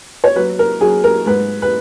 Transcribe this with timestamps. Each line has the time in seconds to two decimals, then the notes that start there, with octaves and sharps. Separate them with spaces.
0.24 C#5
0.36 F#3 B4
0.59 A#4
0.81 F#3 G#4
1.04 A#4
1.26 G#2 B4
1.62 B4